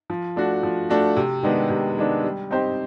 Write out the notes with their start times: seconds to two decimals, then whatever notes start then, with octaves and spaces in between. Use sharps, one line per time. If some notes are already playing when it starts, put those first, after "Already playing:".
0.10 F3
0.36 A3 D4 F#4
0.63 F3
0.90 A3 D4 F#4
1.17 C3
1.43 D#3 G#3 B3 D4
1.70 C3
1.97 D#3 G#3 B3 D4
2.24 G3
2.51 C4 D#4 G4 C5